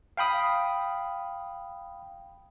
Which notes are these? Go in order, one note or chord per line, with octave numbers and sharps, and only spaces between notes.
F5 G5 B5 D#6